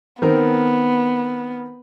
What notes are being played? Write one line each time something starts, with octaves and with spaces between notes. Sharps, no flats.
D#3 B3 C4 A#4